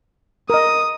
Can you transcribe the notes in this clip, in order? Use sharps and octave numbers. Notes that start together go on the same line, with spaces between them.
A#4 D#5 D#6